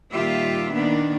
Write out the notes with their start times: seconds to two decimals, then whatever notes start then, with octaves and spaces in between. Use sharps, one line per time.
0.12 A#2 D#3 G3 F4 G4 E5
0.73 D#3 A#3 B3 D4